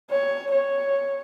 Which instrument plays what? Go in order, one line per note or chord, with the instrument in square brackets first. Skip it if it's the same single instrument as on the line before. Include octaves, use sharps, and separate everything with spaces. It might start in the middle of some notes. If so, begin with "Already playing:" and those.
[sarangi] C#5
C#5